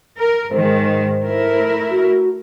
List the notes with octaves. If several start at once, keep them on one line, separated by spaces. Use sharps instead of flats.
A#4
G#2 D#3 G#3 C5
C5
A3 E4 A#4
F#4